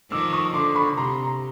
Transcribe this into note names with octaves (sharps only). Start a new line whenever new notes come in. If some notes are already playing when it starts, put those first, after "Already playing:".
D#3 F3 D6 E6
C#6 D#6
D3 C6 D6
B5 C#6
C3 A#5 C6
A#5